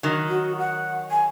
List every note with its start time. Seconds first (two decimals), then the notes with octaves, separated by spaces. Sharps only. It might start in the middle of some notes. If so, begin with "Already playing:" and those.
0.03 D#3 F#3
0.29 F#4
0.59 F#5
1.11 G#5